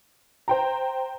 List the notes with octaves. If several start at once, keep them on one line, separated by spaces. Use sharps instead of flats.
C5 G5 A#5